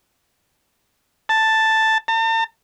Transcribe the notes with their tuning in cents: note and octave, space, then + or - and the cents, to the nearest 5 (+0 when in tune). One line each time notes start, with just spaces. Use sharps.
A5 +5
A5 +45